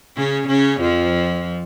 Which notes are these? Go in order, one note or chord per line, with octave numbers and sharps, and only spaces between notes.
C#3 C#4
C#3 C#4
F2 F3